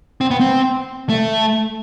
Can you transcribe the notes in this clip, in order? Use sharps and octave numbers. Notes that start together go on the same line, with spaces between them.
C4
B3
C4
A3